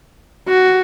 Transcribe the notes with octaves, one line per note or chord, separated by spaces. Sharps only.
F#4